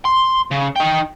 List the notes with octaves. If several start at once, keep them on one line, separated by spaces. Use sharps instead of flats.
C6
C#3
D#4 G5